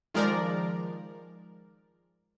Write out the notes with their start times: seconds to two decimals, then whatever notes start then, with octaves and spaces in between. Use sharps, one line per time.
0.14 D#3 F3 G#3 A#4 D5